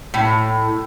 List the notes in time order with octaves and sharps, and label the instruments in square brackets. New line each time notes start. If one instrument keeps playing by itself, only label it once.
[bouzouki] A2